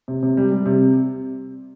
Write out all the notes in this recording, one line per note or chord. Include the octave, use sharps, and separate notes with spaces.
C3
C3
G3
G3
C3